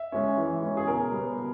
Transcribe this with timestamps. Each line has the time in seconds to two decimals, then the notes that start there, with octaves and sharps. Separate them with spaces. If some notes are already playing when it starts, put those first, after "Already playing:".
Already playing: E5
0.12 G#3 C#4
0.37 E3
0.62 G#3 C#4
0.77 G#4
0.87 B2 A#4
1.12 G3 B3
1.37 B2